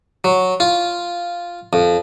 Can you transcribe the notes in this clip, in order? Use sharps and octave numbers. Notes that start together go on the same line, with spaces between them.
F#3
F4
F2